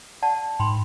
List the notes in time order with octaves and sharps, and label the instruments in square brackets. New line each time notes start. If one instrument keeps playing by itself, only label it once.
[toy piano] D5 F#5 A5
[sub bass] G#2 [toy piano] G5 B5 C6